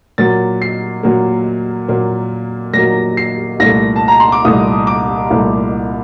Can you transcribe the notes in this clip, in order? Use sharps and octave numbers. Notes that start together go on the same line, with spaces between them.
A#2 F#3 A#3 A6
C7
A#2 F#3 A#3
A#2 F#3 A#3
A#2 F#3 A#3 A#6
C7
C2 A#2 A3 A#6
A5
A#5
C6
D6
C2 A#2 A3 D#6
D6
C2 A#2 A3